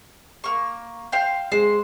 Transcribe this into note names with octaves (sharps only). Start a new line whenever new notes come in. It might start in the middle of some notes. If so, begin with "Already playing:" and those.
A#3 C#6
C5 F5 G5
G#3 C5